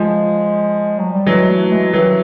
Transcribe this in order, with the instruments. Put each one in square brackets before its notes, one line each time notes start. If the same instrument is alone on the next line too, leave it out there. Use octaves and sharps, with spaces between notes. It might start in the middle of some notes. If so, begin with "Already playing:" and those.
Already playing: [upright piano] F3 [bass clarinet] G#3
[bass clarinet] F#3
G3
[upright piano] E3 F#3 [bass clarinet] G#3
[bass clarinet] A3
G#3
[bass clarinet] D#3 [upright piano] E3 F#3